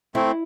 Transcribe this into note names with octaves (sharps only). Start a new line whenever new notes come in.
A3 C4 E4